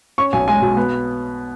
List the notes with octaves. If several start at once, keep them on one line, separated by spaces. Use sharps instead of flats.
C#4 C#6
B1 G#5
G#3 G#5
B2
B3